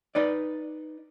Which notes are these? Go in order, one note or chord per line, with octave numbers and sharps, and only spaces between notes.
D#4 B4 D5